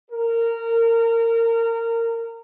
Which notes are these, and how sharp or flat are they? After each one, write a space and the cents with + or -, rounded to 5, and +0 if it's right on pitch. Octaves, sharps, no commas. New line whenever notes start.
A#4 -20